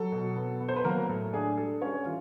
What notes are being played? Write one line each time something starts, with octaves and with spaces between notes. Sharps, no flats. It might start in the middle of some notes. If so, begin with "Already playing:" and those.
Already playing: F#3 A4
B2
B3
B3
C5
B4
F#3 A#3 A#4
A2 A4
D4 G#4
G3 A4
G3 C#4 C#5
E3 F4